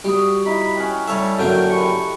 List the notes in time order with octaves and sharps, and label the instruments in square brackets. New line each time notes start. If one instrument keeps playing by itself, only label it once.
[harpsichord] G3 [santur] F#4 D#6
[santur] D#4 E4 D#5 [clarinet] B5
[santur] C#4 F#5 G5
[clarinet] G3 [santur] A3 [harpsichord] C#5 E5
[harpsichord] F#2 D3 A#3 [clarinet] G5
[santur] G4 B4 [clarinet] C#6